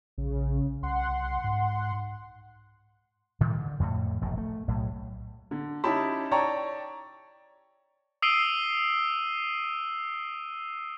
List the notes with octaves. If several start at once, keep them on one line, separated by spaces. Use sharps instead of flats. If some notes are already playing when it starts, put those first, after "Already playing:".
A#1 C#3
C2 F#5 C6
G#2
A2 D#3 E3 G3
D3
F2 A2
E1 A#1 F#2 A2
A3
B1 A2 F#3
D3
C#4 D#4 E4 G4 A5 B5
C#5 D5 G5 A5 A#5 C#6
D#6 E6 C7 D7 D#7 G7